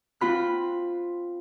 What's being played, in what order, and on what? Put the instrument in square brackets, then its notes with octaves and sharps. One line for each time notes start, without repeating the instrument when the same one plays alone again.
[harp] C4 F4 B5 F#6